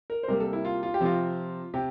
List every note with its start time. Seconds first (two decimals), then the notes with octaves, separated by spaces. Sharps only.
0.10 A#4
0.23 C5
0.28 C3 G3 A#3 A#4
0.40 A4
0.53 E4
0.65 F4
0.83 F4
0.94 G4
1.00 C3 F3 C4 F4
1.74 C3 G4